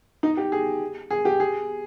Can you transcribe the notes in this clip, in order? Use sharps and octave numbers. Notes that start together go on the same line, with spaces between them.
D#4
G4
G#4
G#4
G4
G#4